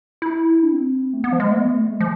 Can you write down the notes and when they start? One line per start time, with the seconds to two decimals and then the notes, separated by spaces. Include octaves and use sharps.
0.22 E4
0.63 D4
0.73 C4
1.13 A3
1.24 B3
1.33 F3
1.40 G#3
1.51 A3
1.57 B3
1.73 A3
1.91 G#3
2.00 F3